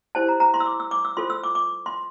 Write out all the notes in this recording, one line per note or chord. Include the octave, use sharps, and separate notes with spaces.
E4 G4 C5 A5
A#5
A#5
C6
E6
D6
E6
D6
E6
F4 A4 C5 C6
E6
D6
D6
C6